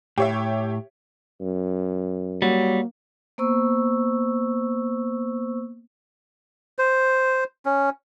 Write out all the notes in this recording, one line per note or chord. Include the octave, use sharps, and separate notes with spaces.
A2 G4 C#5 E5
F#2
F#3 G3 A#3
A#3 B3 C5 C#6 E6
C5
C#4